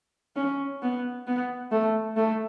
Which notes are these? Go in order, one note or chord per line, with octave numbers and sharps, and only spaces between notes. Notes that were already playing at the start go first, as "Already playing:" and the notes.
C#4
B3
B3
A3
A3